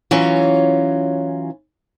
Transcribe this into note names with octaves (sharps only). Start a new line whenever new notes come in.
E3 F#3 C#4 F4